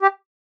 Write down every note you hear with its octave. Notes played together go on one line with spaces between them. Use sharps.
G4